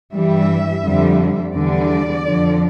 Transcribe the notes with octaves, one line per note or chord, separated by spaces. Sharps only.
G2 E3 G3 E5
F2 D3 G3
E2 D3 G3 D5
F2 D3 F3